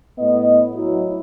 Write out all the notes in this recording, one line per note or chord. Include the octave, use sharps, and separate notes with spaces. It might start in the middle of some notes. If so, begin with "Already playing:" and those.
A2 B3 D#5
F#3 E4